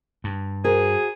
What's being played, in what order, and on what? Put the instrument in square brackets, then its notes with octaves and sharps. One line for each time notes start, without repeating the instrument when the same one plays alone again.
[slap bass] G2
[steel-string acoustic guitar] F#4 A#4 C5 [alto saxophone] G#4